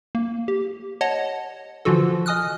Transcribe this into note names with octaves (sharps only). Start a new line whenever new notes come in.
A#3
G4
C#5 D#5 F#5 A5
D3 E3 F3 F4 F#4 A4
D#5 G#5 D#6 F6 F#6